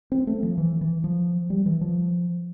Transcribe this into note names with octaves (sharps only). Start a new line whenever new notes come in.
C4
A3
F3
E3
E3
F3
G3
E3
F3